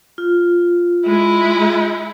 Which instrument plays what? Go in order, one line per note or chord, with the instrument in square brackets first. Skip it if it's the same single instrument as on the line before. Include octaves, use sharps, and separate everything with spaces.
[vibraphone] F4
[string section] G#3 [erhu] E4